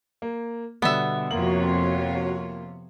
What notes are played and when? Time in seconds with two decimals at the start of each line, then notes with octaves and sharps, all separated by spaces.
0.22 A#3
0.82 B2 D3 G3 B3 E5
1.31 F2 C3 A#3 F4 F#4 C#5 F#7